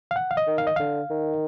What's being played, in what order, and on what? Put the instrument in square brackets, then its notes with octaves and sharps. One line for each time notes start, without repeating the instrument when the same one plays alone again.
[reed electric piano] F5
F#5
F5
D#5
[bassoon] D#3
[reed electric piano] F5
D#5
[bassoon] D3 [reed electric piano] F5
[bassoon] D#3